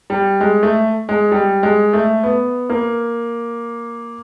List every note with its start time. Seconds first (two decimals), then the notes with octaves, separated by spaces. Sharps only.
0.10 G3
0.41 G#3
0.63 A3
1.09 G#3
1.31 G3
1.63 G#3
1.93 A3
2.24 B3
2.70 A#3